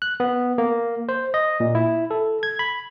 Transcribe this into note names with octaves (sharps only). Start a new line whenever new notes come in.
F#6
B3
A#3
C5
D#5
A#2
E4
A4
G#6
B5